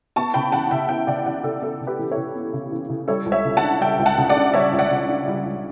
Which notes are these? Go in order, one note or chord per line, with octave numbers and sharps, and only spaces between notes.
B3 A5 C#6
C#3 G5 B5
E3 F#5 A5
C#3 E5 G5
B3 E5 G5
C#3 D5 F#5
E3 D5 F#5
C#3 A4
B3 A4
C#3
G4 B4
E3
A4 C#5
C#3
B3
C#3
E3
C#3
G3 A4 C#5
C#2
C#5 E5
C#3
F#5 A5
D4
G3 E5 G5
C#2
F#5 A5
C#3
D5 F#5
D4
G3 C#5 E5
C#2
D5 F#5
C#3
D4
G3
C#2